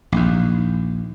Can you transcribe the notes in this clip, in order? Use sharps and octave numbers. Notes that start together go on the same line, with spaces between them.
A#1 D#2